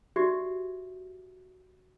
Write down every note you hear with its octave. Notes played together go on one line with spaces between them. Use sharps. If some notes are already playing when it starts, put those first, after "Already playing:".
F#4 G4 D5 E5